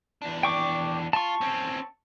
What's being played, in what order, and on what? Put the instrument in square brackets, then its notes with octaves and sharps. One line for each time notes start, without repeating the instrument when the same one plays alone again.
[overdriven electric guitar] E2 D4
[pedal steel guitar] G5 C#6 D6
[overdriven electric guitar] F4 [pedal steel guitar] A5 C#6
[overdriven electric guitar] C4 C#4